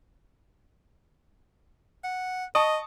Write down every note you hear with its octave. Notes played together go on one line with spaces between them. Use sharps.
F#5
D#5 A5 C#6 D#6